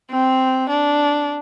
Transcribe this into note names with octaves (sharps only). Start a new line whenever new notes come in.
C4
D4